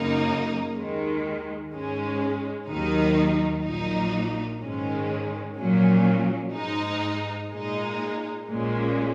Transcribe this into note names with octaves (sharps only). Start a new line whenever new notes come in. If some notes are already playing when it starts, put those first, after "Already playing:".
Already playing: F#2 C#3 A#3 D#4
D#2 D#3 G#3
G#2 G#3 C#4
D#2 D#3 F#3 D#4
A#1 A#2 F#3 D#4
G#2 D#3 G#3 C#4
A#1 A#2 F#3 C#4
G#2 G#3 D#4
A#2 G#3 D#4
A#1 A#2 G#3 C#4